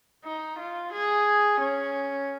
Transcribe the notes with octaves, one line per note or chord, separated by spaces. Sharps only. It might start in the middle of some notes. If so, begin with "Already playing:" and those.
D#4
F4
G#4
C#4